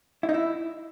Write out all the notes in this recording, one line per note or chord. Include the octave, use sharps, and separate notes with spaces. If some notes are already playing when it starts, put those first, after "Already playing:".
E4
D#4
E4